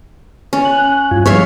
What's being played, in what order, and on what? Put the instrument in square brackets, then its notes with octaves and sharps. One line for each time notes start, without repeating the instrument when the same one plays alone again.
[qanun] C#4
[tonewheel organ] F#6
G2 F4 G#5
[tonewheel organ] F3 G3 G#3 [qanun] C#5 E5 F5